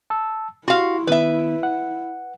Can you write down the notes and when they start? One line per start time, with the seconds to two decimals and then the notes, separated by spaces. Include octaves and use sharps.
0.10 A5 E6
0.68 E4 F#4 G4 F5 C6
1.07 D#3 B3 B4 E5
1.63 F#5